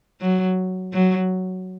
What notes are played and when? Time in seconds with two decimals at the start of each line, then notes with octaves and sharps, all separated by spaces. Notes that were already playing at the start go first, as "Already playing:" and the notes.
0.21 F#3
0.93 F#3